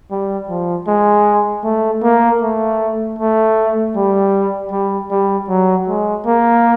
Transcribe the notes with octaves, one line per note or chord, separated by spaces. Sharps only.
G3
F3
G#3
A3
A#3
A3
A3
G3
G3
G3
F#3
G#3
A#3